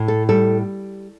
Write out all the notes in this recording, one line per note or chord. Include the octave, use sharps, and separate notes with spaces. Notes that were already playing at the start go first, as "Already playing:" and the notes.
Already playing: A2
A4
G3 A4